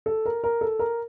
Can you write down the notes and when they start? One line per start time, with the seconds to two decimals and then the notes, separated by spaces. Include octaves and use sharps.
0.06 A4
0.26 A#4
0.44 A#4
0.61 A4
0.79 A#4